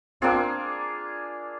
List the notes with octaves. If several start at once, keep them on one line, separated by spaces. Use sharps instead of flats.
A#3 C4 D4 F4 G#4